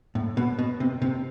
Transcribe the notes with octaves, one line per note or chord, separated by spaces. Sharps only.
A2
B2
B2
C3
C3